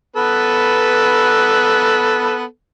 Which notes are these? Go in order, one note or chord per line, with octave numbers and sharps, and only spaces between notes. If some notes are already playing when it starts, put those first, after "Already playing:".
B3 A4 B4